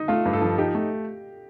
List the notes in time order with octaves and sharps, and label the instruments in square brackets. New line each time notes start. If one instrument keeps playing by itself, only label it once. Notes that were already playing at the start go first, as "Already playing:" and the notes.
Already playing: [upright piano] D#4
[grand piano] A3 [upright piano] F4
[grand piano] G2
[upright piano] A4
[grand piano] F3
[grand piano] D#4 [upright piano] G4
[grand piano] A3